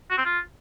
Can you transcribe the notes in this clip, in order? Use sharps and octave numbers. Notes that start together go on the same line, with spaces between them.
F#4
C4
F4